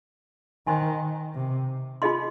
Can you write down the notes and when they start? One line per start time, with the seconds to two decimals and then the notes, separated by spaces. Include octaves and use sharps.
0.67 D#3 C5 D#5 G#5 C6
1.35 C3
2.02 F4 G#4 D#5 C6